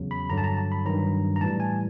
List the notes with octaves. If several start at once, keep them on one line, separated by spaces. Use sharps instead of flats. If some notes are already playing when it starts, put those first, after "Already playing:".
Already playing: E2 C#3 F#3
B5
G2 D3 F#3 A#5
A5
A#5
A5
B5
G2 D#3 F#3 A#5
A#5
A2 E3 G3 A5
G#5